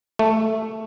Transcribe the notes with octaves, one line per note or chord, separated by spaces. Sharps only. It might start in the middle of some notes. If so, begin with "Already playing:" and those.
A3